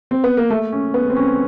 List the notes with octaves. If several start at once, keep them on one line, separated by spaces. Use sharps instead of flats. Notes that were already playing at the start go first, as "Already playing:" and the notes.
C4
B3
A#3
A3
C#4
B3
C4
C#4